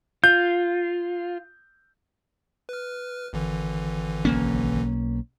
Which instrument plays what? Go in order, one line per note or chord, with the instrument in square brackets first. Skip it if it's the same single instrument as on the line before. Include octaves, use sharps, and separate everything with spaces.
[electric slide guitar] F4 [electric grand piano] G6
[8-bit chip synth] B4 F6
G#1 D3 E3
[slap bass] B1 A#3 C#4